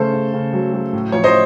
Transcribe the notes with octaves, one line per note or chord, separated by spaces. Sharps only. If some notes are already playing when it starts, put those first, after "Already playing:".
Already playing: C#3 A3 A4 C5
C#3
C#3
F#3
F#3
A2
F3 C#5
C5 D#5